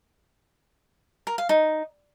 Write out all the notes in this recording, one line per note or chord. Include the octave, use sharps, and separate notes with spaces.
A#4
F5
D#4